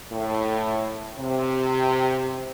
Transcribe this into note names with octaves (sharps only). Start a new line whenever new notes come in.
A2
C3